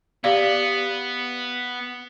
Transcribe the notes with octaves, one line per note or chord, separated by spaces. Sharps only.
B3 G4 D5 F5